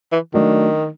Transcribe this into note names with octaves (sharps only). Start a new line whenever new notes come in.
E3
D#3 F#3 A3 D4